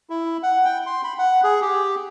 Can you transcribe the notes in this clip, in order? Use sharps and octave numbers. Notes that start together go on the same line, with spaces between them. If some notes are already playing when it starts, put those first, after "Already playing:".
E4
F#5
G5
C6
B5
F#5
G#4
G4